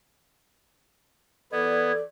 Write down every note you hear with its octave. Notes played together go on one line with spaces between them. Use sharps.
E3 B3 A4 D5 G#6